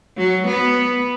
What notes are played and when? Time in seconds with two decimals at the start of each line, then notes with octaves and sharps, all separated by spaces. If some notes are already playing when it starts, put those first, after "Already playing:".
0.17 F#3
0.48 B3